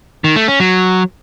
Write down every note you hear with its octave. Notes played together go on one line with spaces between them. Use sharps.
D#3
A3
C#4
F#3